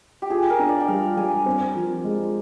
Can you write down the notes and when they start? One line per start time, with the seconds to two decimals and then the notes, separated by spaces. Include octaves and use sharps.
0.22 G4
0.30 F4 G#4
0.50 A#4
0.59 D4
0.69 D5
0.80 G5
0.88 G3 F5
1.17 G3 G#5
1.46 C4
1.75 F3
2.04 G#3